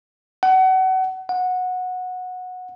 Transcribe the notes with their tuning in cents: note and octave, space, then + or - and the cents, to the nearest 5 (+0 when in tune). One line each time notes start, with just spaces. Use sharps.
F#5 +30
F#5 -15